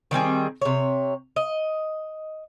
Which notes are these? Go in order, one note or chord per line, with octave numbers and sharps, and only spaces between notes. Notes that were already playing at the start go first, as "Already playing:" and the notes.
D#3 G3 C4 G#4
C3 C#5
D#5